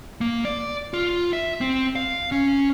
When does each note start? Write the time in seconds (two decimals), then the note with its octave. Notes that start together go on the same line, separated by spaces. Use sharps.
0.21 A#3
0.45 D5
0.94 F4
1.33 E5
1.61 C4
1.96 F5
2.32 C#4